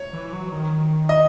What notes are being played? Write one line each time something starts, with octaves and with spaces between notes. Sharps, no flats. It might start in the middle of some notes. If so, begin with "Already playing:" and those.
Already playing: C#5
E3
F#3
D#3
D#5